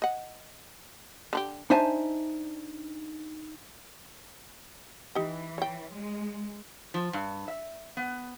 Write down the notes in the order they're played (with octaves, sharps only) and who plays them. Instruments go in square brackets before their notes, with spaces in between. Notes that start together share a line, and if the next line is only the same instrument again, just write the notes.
[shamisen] D#5 F#5
D3 D4 G4
[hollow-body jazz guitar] D4 D#4 C5 E5 G#5 A5
[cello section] E3 [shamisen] D#4 G4
[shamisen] C#5 G5
[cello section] G#3
[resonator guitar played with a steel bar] F3
G2
E5
B3